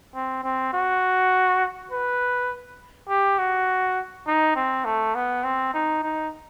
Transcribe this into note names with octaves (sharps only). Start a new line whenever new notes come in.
C4
C4
F#4
B4
G4
F#4
D#4
C4
A3
B3
C4
D#4
D#4